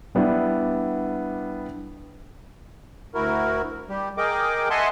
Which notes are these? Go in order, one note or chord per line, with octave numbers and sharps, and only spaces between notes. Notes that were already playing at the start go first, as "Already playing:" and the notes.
G3 B3 D4 E4
D2 E4 F#4 A#4
G3 G4
G#4 A#4 D#5 G5 D6
D#5 E5 F#5 G#5 A5 C6